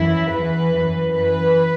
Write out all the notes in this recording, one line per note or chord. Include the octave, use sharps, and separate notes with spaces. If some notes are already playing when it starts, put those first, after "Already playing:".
Already playing: F#2 E3 E4
E2 E3 B4
F#2 E3
F#2 E3 B4